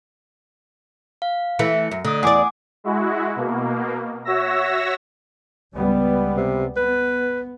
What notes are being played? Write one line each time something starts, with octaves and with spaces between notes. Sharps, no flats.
F5
E3 A3 E5 C#7
F#2
D3 A3 D#6
E2 D5 F#5 G#5 D6
G#3 E4 F#4
B2 A#3
F#4 C#5 E5 E6 A#6
C#2 G3 B3
C3
B3 B4